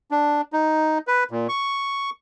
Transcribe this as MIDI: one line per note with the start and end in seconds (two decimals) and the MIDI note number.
0.11 0.41 62
0.53 0.98 63
1.07 1.24 71
1.31 1.47 46
1.49 2.10 85